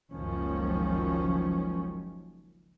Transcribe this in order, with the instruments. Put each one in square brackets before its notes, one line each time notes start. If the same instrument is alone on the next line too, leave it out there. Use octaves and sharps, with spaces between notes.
[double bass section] F#1 C#2 F#2 D#3 F3 C#4